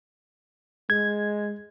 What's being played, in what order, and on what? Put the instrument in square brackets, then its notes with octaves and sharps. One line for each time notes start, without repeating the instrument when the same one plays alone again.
[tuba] G#3 [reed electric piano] G#6